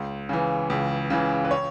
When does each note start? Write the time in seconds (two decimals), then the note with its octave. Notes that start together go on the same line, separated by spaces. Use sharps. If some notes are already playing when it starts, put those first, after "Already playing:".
Already playing: C#2
0.29 C#3 E3
0.70 C#2
1.10 C#3 E3
1.45 B4
1.51 C#5